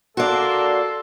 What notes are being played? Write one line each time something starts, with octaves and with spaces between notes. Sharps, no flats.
A#3 D4 F#4 A4 D5 C6